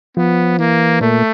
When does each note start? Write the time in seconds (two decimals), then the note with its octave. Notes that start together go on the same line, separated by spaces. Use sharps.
0.17 F3 B3
0.59 E3 A#3
1.01 A#2 A3